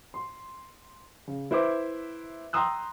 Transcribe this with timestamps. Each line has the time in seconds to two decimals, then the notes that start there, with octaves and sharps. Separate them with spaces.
0.14 C6
1.28 C#3
1.51 E4 B4 C5 E5 D6
2.53 G5 A#5 C6 D#6 E6 F#6